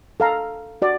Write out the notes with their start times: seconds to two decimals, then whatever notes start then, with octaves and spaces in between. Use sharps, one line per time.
0.20 A4 F5 A#5
0.82 F#4 D5